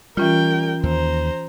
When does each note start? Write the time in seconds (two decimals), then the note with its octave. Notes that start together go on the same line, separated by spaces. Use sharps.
0.17 E3 G3 C#4 F4 A#4 G5
0.83 D#2 C5 A#5